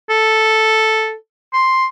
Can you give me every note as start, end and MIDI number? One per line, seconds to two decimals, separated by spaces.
0.09 1.14 69
1.53 1.86 84